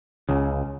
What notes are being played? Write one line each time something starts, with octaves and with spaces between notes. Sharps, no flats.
C#2 C#3